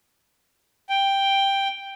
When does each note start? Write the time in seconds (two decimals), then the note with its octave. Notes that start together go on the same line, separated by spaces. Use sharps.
0.89 G5